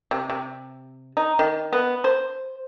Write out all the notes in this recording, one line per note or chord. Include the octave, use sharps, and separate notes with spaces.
C3
C3
D#4
D#3
B3
C5